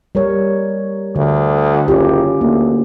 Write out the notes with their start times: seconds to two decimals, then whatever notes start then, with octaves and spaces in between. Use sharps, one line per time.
0.15 G3 A#4 C#5
1.16 D2 D3
1.88 F#1 C#4 F4 G4
2.41 D2 A#3